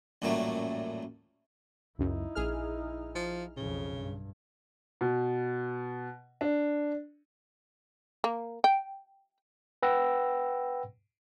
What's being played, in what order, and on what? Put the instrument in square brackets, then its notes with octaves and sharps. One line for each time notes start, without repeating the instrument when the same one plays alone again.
[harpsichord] A1 F#2 A#2 F#3 G3 A3
[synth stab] C#2 F#2 [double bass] D#4 E4
[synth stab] A#1 G#4 F6
[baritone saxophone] F3
[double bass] B1 F2 [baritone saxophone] C#3
[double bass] G2
[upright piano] B2
D4
[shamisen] A#3
G5
[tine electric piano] B4 F#5 G5 B5 E6 A#6